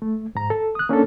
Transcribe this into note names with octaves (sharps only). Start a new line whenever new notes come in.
A3
G#2 A#5
A4
D#6 F#6
A#3 C#4 D4 A4